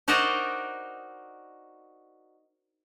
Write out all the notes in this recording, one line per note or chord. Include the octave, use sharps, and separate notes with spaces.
D#4 F#4 A#4 C5 D5 D#5